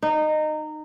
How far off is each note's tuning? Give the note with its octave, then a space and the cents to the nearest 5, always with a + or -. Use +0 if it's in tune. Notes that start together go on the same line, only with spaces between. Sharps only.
D#4 -20